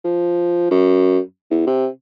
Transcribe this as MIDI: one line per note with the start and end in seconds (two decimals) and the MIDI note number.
0.05 0.69 53
0.71 1.19 42
1.51 1.64 40
1.67 1.88 48